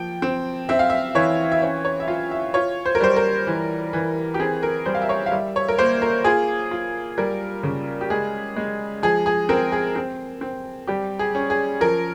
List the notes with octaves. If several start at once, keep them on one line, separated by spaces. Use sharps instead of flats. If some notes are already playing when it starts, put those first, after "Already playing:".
Already playing: F3 A#3 G5
C4
C4 E5
F5
E5
E3 C#5
E5
C#4 C#5
C#5
E5
F4 F5
E5
F4 C#5
C5
A#4
G3 C5
A#4
E3
E3
G4
C4 G#4
A#4
G3 C5
F5
E5
C#5
F5
G3 E5
C#5
A#4
A#3 C5
A#4
F4 G#4
F4
G3 A#4
C#3
G4
G#3 G#4
G#3
F3 G#4
G#4
C4 A#4
G#4
C4
C4
G3 G4
G#4
C#4
G#4
F3 A#4